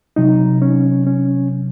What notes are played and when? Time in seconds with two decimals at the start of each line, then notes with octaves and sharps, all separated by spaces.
0.16 C3 F#3 D#4
0.62 C#4
1.07 C#4